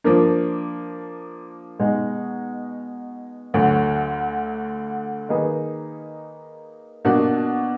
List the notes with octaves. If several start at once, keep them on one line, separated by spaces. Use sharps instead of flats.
F3 A#3 D4
B2 G#3 D#4
D2 D3 F#3
D#3 A#3 D#4 G#4 B4
B2 A#3 D4 F#4